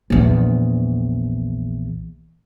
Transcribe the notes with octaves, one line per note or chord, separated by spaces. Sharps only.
A#1 E2